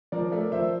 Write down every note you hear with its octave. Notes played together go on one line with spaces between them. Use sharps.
F3 A#4 D5
A3 A#4 D5
F3 C5 E5